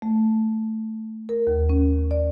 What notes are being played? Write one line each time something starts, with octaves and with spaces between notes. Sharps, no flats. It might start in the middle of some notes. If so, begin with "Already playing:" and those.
A3
A#4
D#2
C#4
D5